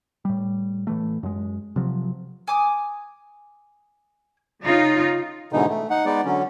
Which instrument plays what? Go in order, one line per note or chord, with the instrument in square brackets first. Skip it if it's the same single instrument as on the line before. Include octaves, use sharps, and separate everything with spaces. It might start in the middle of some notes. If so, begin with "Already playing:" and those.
[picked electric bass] A2 G3
A2 E3 A3
F#2 G#3
C3 F3 F#3
[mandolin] G#5 D6 D#6
[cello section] C#3 D#4 F4
[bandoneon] G#2 B2 D3 E3 D#4
A3
D#4 F#5
G#3 B3 D#4 D5
D3 F#3 C#4